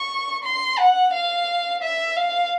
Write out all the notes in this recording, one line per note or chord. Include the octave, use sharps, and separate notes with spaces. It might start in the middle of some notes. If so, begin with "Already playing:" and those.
Already playing: C#6
C6
F#5
F5
E5
F5